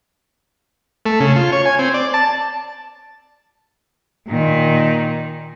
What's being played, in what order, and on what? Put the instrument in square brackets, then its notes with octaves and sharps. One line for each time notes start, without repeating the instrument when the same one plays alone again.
[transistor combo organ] A3
C#3
F4
C#5
G#5
C4
D5
A5
[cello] A#2 D#3